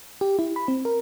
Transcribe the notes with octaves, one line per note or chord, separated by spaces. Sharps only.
G4
E4
B5
C4
A#4